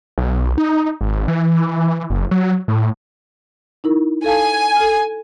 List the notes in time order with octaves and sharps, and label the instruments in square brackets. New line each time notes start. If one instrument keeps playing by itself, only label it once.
[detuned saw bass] B1
D#4
G#1
E3
F#1
F#3
A2
[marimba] D#4 E4 A#4
[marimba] A4 F5 A5 [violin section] G#5
[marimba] A4 F6